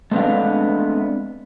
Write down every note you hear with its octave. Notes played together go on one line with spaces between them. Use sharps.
G#3 A3 B3 C4 D4 F5